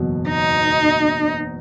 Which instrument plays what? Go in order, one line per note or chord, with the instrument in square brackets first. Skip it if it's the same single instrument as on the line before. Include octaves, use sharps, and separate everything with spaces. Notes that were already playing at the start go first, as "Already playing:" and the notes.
Already playing: [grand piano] F#1 E2 B2 F#3 B3
[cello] D#4